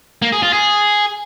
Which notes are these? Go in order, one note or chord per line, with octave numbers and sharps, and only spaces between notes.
A#3
G#4
F4
G#4